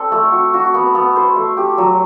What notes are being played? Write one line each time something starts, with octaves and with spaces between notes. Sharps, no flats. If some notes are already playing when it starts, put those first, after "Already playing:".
Already playing: C4 A4 D5
A3
F#4
F#4
B3
B3
C5
A3
G4
F#3